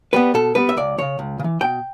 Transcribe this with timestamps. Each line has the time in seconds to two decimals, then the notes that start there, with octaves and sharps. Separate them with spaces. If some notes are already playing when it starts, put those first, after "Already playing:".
0.13 G3 B3 B4
0.34 B2 A4
0.55 G3 B3 B4
0.69 E5
0.77 C#2 D5
0.98 C#3 E3 C#5
1.19 C#2
1.39 C#3
1.44 E3
1.61 B2 G5